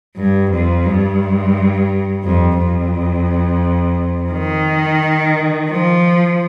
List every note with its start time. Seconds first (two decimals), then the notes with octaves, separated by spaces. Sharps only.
0.16 G2
0.51 F2
0.85 G2
2.24 F2
2.58 F2
4.32 D#3
5.71 F3